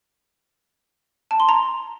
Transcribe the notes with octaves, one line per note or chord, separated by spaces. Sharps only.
A5
C6
A#5